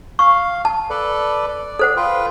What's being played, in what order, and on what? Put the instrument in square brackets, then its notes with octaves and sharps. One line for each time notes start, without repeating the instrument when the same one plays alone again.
[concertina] F5 [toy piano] C#6
[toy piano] A5
[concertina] A4 B4 D5
D5
[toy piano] A4 C5 F#5
[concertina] F4 B4 G5